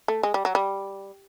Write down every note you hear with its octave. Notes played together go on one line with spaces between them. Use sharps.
A3
G#3
G3
F#3
G3